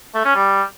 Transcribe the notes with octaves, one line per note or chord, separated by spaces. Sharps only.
A3
C#4
G3